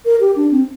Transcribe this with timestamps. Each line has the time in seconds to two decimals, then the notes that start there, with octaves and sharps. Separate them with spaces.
0.05 A#4
0.20 G4
0.36 D4
0.51 C4